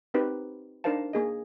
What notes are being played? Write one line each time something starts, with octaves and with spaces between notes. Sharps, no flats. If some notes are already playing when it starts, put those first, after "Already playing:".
C4 D#4 G4 B4 C5
D4 D#4 A#4 C5 F5 A5
A#3 G#4 D#5